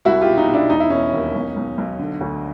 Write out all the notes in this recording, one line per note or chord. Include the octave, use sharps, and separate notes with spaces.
C2 E4 F#4
F4 G4
B2
D#4 F4
B2
D4 E4
E1 D#4
E4
E1 C#4 D#4
D#2
B1
B1
B1
D3
D2